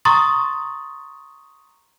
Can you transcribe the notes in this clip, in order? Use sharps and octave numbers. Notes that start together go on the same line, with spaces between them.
A#5 C6 C#6 D#6 A6